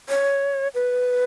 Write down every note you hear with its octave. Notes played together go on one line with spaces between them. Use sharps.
C#5
B4